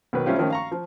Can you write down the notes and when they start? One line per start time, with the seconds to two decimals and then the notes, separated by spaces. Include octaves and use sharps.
0.13 B1 D#3 B4
0.26 G3 A3 C4 C#4 F4 G4
0.38 D#3 F3 A3 C#4
0.50 F5 A#5 C#6
0.72 F3